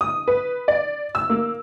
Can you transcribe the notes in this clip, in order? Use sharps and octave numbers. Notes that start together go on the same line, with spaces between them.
D#6
B4
D5
E6
A#3